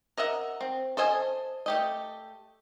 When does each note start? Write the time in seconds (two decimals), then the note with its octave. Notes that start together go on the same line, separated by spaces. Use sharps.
0.17 A#4 D#5 E5 F#5
0.61 C4
0.97 A4 C5 D#5 G#5
1.66 A3 G4 D#5